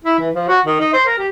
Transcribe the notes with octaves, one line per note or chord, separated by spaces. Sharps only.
E4
E3
F3
F#4
D#3
D#4
C5
A#4
G4